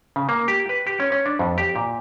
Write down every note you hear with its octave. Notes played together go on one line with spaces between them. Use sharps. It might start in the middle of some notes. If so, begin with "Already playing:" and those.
C#3
A#3
G4
B4
G4
C#4
C#4
D4
F2
G4
A#2